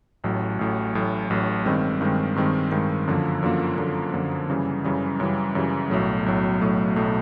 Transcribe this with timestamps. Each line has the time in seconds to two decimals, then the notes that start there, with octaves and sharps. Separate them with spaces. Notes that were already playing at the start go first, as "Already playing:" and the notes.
0.24 A1 A2 F#3
0.59 A1 A2 F#3
0.95 A1 A2 F#3
1.30 A1 A2 F#3
1.66 G2 D#3 G#3 C4
2.01 G2 D#3 G#3 C4
2.36 G2 D#3 G#3 C4
2.71 G2 D#3 G#3 C4
3.08 F#2 D3 F3 A#3
3.43 F#2 D3 F3 A#3
3.78 F#2 D3 F3 A#3
4.13 F#2 D3 F3 A#3
4.49 F#2 C#3 E3 G3
4.84 F#2 C#3 E3 G3
5.20 F#2 C#3 E3 G3
5.55 F#2 C#3 E3 G3
5.90 B1 A2 F#3 A3
6.26 B1 A2 F#3 A3
6.61 B1 A2 F#3 A3
6.96 B1 A2 F#3 A3